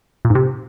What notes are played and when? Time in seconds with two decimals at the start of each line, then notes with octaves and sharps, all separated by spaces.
0.25 A#2
0.30 G#2
0.35 C3